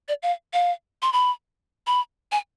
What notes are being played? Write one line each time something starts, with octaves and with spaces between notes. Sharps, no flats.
D5
F5
F5
C6
B5
B5
G#5